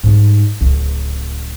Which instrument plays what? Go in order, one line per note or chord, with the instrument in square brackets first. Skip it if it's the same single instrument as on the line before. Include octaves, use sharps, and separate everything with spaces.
[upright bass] G#2 G3
D1 C#2